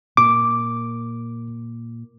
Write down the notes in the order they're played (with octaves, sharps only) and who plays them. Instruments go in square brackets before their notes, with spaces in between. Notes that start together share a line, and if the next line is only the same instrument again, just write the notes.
[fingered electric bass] A#2 [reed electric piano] D6